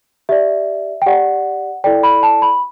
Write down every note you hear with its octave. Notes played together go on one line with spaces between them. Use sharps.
G4 D5 E5
G5
G4 D5 F#5
E4 A4 D5 G5
B5
A5
B5